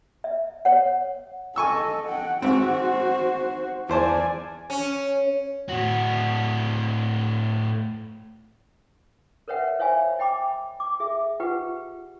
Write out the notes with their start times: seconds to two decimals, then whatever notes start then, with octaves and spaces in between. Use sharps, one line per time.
0.24 E5
0.65 C#5 F#5
1.56 A4 D#5 G#5 C#6 E6
2.06 F#5 G5
2.42 G#2 C4 F#4 C5
3.89 E2 C5 D5 G#5 A5
4.70 C#4
5.69 A2 F#4
9.48 A#4 B4 C#5 E5 F#5
9.79 C5 C#5 E5 F5 G#5 B5
10.19 D#5 G5 B5 D6
10.80 D6
11.00 G#4 E5
11.40 F4 G4 B4 F#5